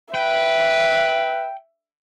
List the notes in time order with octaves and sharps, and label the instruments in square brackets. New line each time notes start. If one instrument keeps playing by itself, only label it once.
[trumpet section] B4 [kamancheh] E5 [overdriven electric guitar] G5